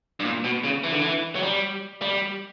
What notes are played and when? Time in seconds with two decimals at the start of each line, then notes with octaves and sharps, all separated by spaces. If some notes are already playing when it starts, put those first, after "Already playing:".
0.20 G2
0.25 A#2
0.44 B2
0.64 C#3
0.84 E3
0.92 D3
0.99 E3
1.35 F#3
1.43 G3
2.02 G3